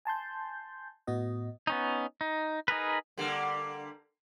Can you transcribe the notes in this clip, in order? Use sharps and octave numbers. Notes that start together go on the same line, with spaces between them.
G#5 A5 C6 G6
A2 B3 F#4 D#5
B3 C#4 D#4
D#4
D#4 G#4 A#4 B4
D3 G3 A#3